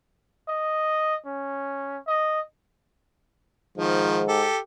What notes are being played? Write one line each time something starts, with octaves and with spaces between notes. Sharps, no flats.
D#5
C#4
D#5
G#2 D#3 F3
G4 A4